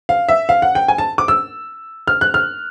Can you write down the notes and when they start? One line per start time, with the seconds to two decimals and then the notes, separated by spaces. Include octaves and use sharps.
0.09 F5
0.29 E5
0.49 F5
0.62 F#5
0.75 G5
0.88 G#5
0.98 A5
1.18 D6
1.28 E6
2.08 F6
2.21 F#6
2.34 F6